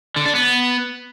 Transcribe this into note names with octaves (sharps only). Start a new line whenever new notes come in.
D3
D4
B3